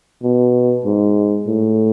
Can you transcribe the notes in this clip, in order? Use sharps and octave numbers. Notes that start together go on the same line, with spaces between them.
B2
G#2
A2